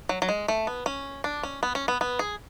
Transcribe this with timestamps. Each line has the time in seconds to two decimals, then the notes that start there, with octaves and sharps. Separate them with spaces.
0.09 F#3
0.22 F#3
0.29 G#3
0.48 A3
0.67 B3
0.86 C#4
1.24 D4
1.43 C#4
1.63 B3
1.75 C#4
1.88 B3
2.01 B3
2.19 G#4